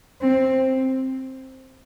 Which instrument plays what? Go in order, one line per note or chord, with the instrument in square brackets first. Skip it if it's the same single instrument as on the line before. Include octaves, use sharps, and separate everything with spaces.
[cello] C4